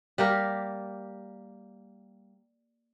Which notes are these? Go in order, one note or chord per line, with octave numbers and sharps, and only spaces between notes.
G3 A#3 G4 A#4